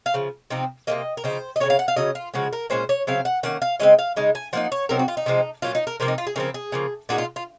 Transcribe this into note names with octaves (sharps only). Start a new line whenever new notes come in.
F5
C#3 F3
C3 F3 C4 D#4
C3 F3 A#3 D#5
A#4
C#3 F3 C4 D#4 C5
D#5
C#3 G#3 C#4 C#5
F5
F#5
F5
C#3 F#3 C#4 D#5
F4
C#3 F3 G#3 F#4
A#4
A#2 G#3 C#4 C5
C#5
C#3 F#3 C4 F5
F#5
D#3 A#3 C#4 F#5
F5
C#3 G#3 C4 D#5
F5
C#3 G#3 D#4
G#5
F3 A#3 D#4 F#5
C#5
C3 F#3 C4 D#4 A#4
F#4
F4
D#4
C3 F3 G#3 C4
A#2 F#3 C#4 F4
D#4
A#4
C3 F3 A#3 A#4
D#4
F4
G#4
C#3 F3 C4 A#4
G#4
C#3 F3 A#3
A#2 G#3 D#4 F#4
F4
F4